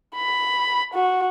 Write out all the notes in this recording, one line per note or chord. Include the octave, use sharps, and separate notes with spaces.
B5
F#4